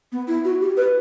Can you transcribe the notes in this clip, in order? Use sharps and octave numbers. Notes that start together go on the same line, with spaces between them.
B3
E4
F#4
G4
B4